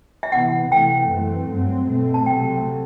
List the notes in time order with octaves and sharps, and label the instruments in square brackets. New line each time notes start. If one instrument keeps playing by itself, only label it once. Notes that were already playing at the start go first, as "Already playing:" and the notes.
[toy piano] E5
[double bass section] C3 E3 B3 [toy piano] F#5
[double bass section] C3 E3 A3 [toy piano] G5
[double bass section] F#2 E3 A3 C4
G2 F#3 C4
B2 A3 C4
[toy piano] A5
[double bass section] C3 F#3 A3 C4 [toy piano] G5